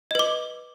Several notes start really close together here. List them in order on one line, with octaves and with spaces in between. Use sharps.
D#5 B4 D6